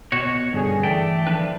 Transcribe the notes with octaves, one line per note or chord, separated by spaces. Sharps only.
B2 F#4 C#5
G2 D3 C#4 G#4
E3 A3 D5 G5 A5
F3 D4 B4